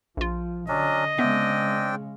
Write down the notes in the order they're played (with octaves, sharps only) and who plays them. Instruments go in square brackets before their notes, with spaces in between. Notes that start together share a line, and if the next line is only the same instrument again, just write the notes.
[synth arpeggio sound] A#1 F4 [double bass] F3
[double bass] D3 [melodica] F#3 C#4 D4 [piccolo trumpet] D#5
[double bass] C#3 G#3 [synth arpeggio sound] B3 E5 [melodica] C4 D4 G5